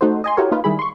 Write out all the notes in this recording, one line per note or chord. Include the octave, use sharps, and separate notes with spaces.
A3 D#4 F#4 A4 C5
D#5 G#5 C6
E4 F#4 G4 A4 A#4 C#5
A#3 D#4 F4 B4
D#3 G3 E4 G#4 B5
C6 C#6